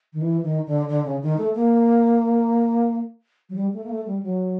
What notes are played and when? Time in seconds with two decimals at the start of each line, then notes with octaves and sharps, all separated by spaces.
0.13 D#3
0.21 E3
0.43 D#3
0.66 D3
0.89 D3
1.05 C#3
1.22 D#3
1.38 A3
1.55 A#3
3.50 F#3
3.55 G3
3.73 A3
3.84 A#3
3.89 A3
4.06 G3
4.23 F#3